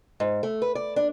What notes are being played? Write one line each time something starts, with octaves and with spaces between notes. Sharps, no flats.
G#2
A3
B4
D5
D4